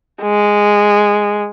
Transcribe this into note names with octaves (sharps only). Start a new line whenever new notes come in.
G#3